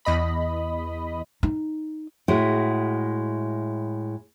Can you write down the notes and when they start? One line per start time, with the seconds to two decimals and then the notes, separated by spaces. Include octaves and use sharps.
0.05 E2 D#5 B5
1.43 D#4
2.28 A2 G#3 E4 F#4